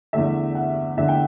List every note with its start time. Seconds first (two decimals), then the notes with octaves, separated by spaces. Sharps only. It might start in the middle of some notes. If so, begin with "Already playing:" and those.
0.13 E2 D3 A3 E5
0.55 F#5
0.97 E2 D3 A3 E5
1.09 G5